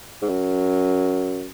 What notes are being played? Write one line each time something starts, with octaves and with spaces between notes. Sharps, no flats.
G#2
F#2